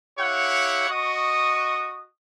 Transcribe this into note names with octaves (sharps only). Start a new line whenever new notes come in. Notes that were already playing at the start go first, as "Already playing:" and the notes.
E4 G4 C#5 F5 F#5
F#4 D#5 C#6 D#6